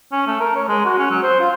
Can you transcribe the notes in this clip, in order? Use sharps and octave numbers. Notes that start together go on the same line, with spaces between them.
C#4
A3
A#4
C#5
G#3
F#4
C#4
F#3
C5
F4